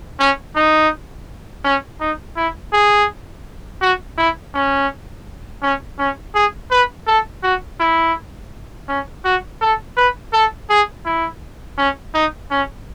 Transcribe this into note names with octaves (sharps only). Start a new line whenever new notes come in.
C#4
D#4
C#4
D#4
E4
G#4
F#4
E4
C#4
C#4
C#4
G#4
B4
A4
F#4
E4
C#4
F#4
A4
B4
A4
G#4
E4
C#4
D#4
C#4